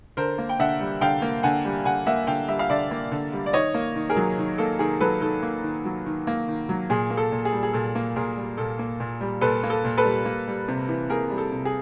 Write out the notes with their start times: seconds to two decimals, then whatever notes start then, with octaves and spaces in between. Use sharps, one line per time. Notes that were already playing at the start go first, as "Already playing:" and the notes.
0.17 D3 A#4 C5
0.38 A#3
0.49 G5
0.59 D3 E5 F#5
0.80 G3
1.01 D3 F5 G5
1.22 A#3
1.43 D3 F#5 G#5
1.65 G3
1.85 D3 F#5 G#5
2.06 A#3 E5 F#5
2.27 D3 F5 G5
2.49 G3 E5
2.59 F5
2.70 D3 D5 E5
2.91 A#3
3.12 D3
3.33 G3
3.46 D5
3.53 D#3 C#5 D#5
3.74 A#3
3.95 D#3
4.10 G#4 A#4
4.16 F#3
4.38 D#3
4.58 A#3 A4
4.79 D#3 G#4 A#4
5.00 F#3 A4 B4
5.22 D#3 A4
5.43 A#3
5.64 D#3
5.85 F#3
6.06 D#3
6.27 A#3
6.48 D#3
6.69 F#3
6.90 A#2 G#4
7.10 A#3
7.17 A4
7.32 A#2
7.45 G#4
7.52 G3
7.63 G#4
7.73 A#2 A4
7.95 A#3
8.16 A#2 G#4 A#4
8.37 G3
8.58 A#2 A4
8.79 A#3
9.00 A#2
9.21 G3
9.41 A#2 A4 B4
9.63 A#3
9.70 A4
9.85 A#2
9.98 A4 B4
10.04 G3
10.25 A#3
10.48 G3
10.68 C3
10.89 E3
11.10 A#3 G#4 A#4
11.30 G3
11.38 A4
11.52 C3
11.65 G#4